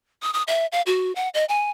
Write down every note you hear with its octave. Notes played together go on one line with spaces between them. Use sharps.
D#6
D#6
E5
F5
F#4
F#5
D#5
G#5